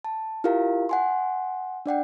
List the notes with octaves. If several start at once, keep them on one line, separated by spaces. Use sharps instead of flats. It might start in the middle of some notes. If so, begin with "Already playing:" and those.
A5
E4 F4 G4 A#4 F5
F#5 G#5 C6
D4 D5 F#5 G5